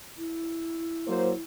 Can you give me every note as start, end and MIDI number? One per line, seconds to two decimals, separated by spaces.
0.18 1.42 64
1.08 1.31 54
1.08 1.31 58
1.08 1.31 72